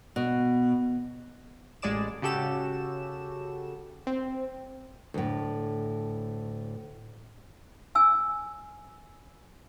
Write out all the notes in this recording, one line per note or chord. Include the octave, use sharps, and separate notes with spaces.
B2
A1 G#3 G#4 D5 D6 E7
C#3 F#4 G4 A4 E7
C4
D2 A2
G#5 E6